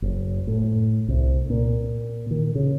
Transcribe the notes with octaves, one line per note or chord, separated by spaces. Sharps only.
F#1
A2
C2
A#2
D#3
C#3